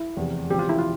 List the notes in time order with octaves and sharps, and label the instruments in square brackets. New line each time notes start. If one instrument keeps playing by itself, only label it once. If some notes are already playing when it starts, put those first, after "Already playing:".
Already playing: [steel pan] E4
[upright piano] F1 E2 C3
[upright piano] E1 E2 C#3 F3 C4 [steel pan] G4
[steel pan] F4
E4
F4